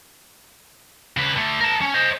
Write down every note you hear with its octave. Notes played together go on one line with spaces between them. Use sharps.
C#3 B4
D3 A3
A#4 A5
C#4
C5 D#5